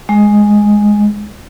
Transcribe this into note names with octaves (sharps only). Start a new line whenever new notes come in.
G#3